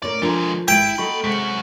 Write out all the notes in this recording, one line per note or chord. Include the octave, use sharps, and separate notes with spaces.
A2 C#4 A#4 D5
E3 F3 G#3 D4 A4 A#4
G#1 G#3 E4 G5 B6
A#3 F#4 A4 D#5 B5 C#6
F#2 C3 G#3 F#4 B6 C#7